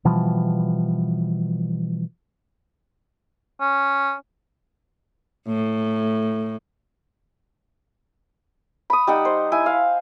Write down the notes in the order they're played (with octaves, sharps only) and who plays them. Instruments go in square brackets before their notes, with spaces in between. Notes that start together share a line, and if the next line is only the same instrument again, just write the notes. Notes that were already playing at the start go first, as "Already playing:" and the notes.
[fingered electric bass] B2 E3 F3 G3
[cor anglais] C#4
[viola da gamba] A2
[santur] B5 D#6
G3 D#4 F#5
C5
E4 G#5
F5